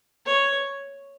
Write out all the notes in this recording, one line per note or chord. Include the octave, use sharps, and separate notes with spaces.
C#5